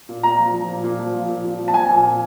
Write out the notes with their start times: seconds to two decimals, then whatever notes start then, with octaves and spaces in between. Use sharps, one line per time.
0.09 A#2
0.23 A#2 A#5
0.39 F3
0.54 F3
0.68 A#2
0.84 A#2
0.99 F3
1.13 F3
1.28 A#2
1.44 A#2
1.59 F3
1.68 A5
1.73 F3 G#5
1.90 A#2
2.04 A#2